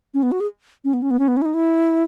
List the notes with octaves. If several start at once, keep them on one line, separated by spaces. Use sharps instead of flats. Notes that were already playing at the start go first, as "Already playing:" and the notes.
C#4
B3
F#4
G#4
C#4
B3
C#4
B3
C#4
B3
C#4
E4
D#4
E4